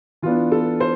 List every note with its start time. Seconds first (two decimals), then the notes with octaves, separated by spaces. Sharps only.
0.22 E3 B3 D4 F4
0.52 A4
0.80 C5